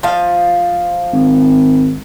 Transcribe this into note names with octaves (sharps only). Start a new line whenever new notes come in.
F3 F5
G#1